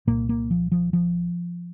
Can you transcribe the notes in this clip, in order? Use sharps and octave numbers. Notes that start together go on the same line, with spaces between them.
C2 A#2 A#3
A#3
F3
F3
F3